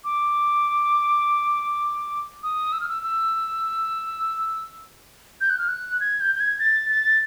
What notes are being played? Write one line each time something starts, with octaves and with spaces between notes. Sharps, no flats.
D6
D#6
E6
F6
E6
E6
G6
F#6
F6
F#6
G#6
G6
G6
G#6
A6
A6